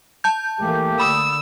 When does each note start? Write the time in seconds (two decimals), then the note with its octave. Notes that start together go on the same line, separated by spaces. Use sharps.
0.24 A5 G6
0.61 E3 A3 A#3 G4
0.99 D3 B5 D#6 E6